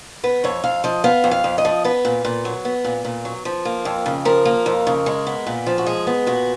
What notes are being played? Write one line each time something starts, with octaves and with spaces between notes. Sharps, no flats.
B3 B4
F2 C#5
F2 F5
F3 D#5
B3 F5
F2
F5
F2
D#5
F3
B3 B4
A#2
A#2
F#3
B3
A#2
A#2
F#3
F3
A#3
F2
C#3
F3 A#4
A#3
F2
C#3
G#3
B3
A#2
F3
F#4
G#3 G#4
B3
A#2 F#4